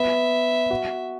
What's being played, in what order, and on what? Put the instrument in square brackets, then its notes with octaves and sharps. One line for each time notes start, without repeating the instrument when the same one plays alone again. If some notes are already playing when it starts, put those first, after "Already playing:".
Already playing: [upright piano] B3 [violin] E5
[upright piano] F#4